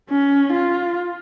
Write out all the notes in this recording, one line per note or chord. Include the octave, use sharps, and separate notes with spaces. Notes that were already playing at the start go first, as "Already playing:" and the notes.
C#4
F4